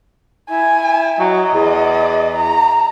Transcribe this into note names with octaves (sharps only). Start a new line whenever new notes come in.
E4 G#5
F#3 D#5
E2
A#5